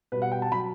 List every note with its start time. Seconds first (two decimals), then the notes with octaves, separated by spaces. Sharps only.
0.12 B2 G3 B4
0.22 F#5
0.32 G5
0.42 A5
0.52 F#3 B5